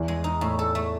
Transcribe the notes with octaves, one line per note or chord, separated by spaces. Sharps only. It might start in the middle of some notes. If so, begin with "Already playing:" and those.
Already playing: E2 E3
G#3
D#4
A2
A4
A3